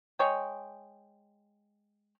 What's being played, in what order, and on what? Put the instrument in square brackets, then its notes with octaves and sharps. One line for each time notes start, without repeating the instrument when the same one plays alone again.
[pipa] G#3 C#5 G5